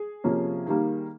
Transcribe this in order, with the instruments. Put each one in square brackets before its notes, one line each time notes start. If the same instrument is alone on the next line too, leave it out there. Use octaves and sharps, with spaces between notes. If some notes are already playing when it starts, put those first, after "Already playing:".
Already playing: [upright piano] G#4
C3 F3 A#3 C#4
D#3 G3 A#3